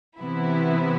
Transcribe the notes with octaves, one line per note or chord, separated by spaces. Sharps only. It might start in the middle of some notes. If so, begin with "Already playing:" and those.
C3 E3 B3 E4